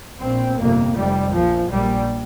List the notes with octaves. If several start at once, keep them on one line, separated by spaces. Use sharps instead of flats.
A#1 A#2 C4
G1 F2 C3 A#3
F1 F2 C3 G3
A#1 A#2 F3
A#1 A#2 G3